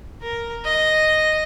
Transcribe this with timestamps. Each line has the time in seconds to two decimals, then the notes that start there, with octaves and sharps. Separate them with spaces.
0.22 A#4
0.65 D#5